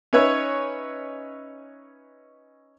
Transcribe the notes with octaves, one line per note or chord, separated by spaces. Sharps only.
C#4 D#4 B4 C#5 E5